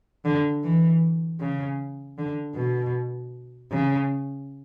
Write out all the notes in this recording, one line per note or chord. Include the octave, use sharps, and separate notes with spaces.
D3
E3
C#3
D3
B2
C#3